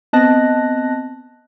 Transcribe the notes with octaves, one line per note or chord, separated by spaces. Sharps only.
B3 C4 D#5 A5 F#6 A#6